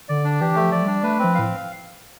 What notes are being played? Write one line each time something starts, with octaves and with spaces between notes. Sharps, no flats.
D3 D5
D4
E3 G4
A3
F3
D5
G3 D4
A3 B4
C4
F3
A2 F5